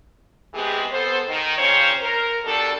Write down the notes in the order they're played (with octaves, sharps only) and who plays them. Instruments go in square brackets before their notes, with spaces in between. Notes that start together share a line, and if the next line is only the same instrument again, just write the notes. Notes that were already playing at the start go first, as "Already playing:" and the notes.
[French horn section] E3 G#3 B3 C4 G4 G#4
B3 A4 C5
D#3
A#2 C#3 C4 C#4 C5 C#5
A#4
B2 G3 D4 A4